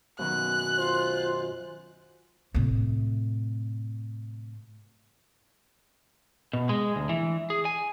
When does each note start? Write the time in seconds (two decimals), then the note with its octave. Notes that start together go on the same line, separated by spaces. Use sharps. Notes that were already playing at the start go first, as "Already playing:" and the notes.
0.19 F#2 B2 D#3 F#6
0.78 F4 C5
2.54 A2 C3
6.53 B2
6.69 G#3
6.96 D2
7.09 E3
7.50 G#4
7.65 G#5